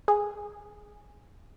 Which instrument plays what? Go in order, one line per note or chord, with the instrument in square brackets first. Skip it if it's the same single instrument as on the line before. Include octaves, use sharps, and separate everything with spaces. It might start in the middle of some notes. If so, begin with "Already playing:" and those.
[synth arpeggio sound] G#4